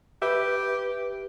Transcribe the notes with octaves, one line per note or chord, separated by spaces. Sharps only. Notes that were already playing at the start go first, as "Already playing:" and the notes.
G4 B4 E5